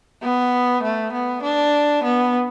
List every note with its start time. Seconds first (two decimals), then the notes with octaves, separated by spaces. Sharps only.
0.23 B3
0.83 A3
1.13 B3
1.43 D4
2.04 B3